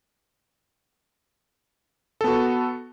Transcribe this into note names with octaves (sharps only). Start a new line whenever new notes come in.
B3 F#4 A4